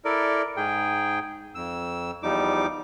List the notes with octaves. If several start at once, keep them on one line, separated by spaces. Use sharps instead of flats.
E4 A4 A#4 D5
G#2 G#4 G5
F2 E6
E2 F3 G3 D#4 D6